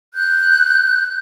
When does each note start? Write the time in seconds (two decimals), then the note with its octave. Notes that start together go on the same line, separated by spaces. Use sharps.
0.14 F#6 G6